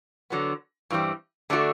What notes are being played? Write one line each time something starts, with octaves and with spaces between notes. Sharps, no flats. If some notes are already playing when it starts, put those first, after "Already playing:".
D3 F#3 B3
G2 E3 G3 C4
D3 A3 D4 F#4